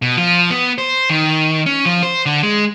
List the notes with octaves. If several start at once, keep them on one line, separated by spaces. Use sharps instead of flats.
B2
F3
B3
C5
D#3
C#4
F3
C5
D3
G#3